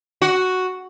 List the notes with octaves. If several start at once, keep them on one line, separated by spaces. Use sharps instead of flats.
F#4